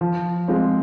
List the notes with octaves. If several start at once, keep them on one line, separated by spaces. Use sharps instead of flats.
F3
G#3 C4 F4